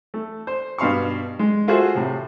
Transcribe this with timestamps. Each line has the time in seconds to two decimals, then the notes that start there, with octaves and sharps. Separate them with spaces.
0.14 A3
0.47 C5
0.78 G2 B2 F5 C6 C#6
1.39 G#3
1.68 F4 F#4 G#4 A4 C5 E5
1.95 A2 C3